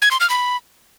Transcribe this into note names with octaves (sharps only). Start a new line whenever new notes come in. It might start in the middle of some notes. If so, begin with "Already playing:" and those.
G#6
C6
F6
B5